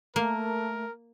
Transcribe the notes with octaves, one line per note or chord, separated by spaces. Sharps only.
A3 A#3 A#4